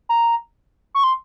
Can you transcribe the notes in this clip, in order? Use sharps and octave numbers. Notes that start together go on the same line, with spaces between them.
A#5
C#6
C6